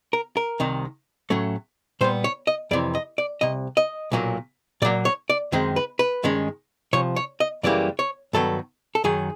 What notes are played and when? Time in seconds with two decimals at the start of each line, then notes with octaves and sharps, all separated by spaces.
0.13 A#4
0.37 A#4
0.60 C2 C3 D#3
1.30 A2 F#3 A3 C#4
2.01 A#2 G3 B3 C5
2.24 C#5
2.47 D#5
2.71 F2 C3 E3 D5
2.95 D#5
3.18 D5
3.41 C2 C3 D#5
3.77 D#5
4.12 B1 A#2 F#3 A#3
4.82 A#2 F#3 A#3 D5
5.05 C#5
5.30 D5
5.52 F#2 D#3 G#3 C4
5.76 B4
5.99 B4
6.23 G2 D#3 G#3 C#4
6.93 C2 C3 F3 C#5
7.16 C#5
7.40 D#5
7.63 F#2 C#3 E3 G3 A#3 D5
7.99 C#5
8.33 G2 D#3 F#3 B3 A4
8.95 A4
9.04 F#2 D#3 F#3 G#4